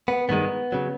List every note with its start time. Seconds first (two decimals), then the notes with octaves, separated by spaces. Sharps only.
0.08 B3
0.29 G2 D#3 G#3 B3
0.72 C#3 F#3